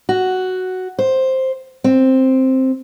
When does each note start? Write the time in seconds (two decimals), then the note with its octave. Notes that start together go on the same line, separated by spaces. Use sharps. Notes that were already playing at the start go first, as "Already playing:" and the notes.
0.09 F#4
0.99 C5
1.84 C4